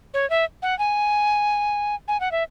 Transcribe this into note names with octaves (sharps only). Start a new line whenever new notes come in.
C#5
E5
F#5
G#5
G#5
F#5
E5